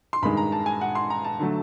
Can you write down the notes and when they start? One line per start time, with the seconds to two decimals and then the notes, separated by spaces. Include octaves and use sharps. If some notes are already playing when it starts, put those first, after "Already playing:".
0.13 C6
0.22 G2 D#3 G#3 B5
0.37 A#5
0.52 A5
0.66 G#5
0.81 F#5
0.95 C6
1.10 A#5
1.24 A5
1.39 D3 F#3 A3